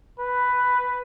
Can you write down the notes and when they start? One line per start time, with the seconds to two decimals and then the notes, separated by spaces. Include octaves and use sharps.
0.19 B4